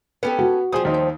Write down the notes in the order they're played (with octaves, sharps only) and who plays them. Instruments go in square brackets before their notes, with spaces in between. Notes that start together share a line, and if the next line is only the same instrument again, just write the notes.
[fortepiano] B3 [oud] C#4 G4 A4
[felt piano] F#4
[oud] F3 G3 [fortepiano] G#4 C5 D#6
[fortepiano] D#2 D#4